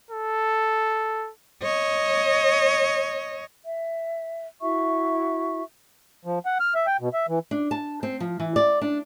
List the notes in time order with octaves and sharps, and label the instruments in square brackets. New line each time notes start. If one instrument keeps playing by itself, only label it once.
[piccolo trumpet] A4
[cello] C#5 D#5
[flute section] E5
E4 F#4 E5 C#6
[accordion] F3
F#5
F6
E5
G5
B2
E5
E3
[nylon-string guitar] D4
A5
C4
F3
E3
D5
D4